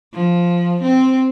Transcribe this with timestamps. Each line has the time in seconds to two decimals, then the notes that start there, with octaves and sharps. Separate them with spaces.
0.14 F3
0.82 C4